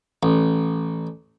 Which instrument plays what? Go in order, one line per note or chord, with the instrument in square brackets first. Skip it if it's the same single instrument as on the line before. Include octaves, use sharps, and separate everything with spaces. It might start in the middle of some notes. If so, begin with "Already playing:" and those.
[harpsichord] A1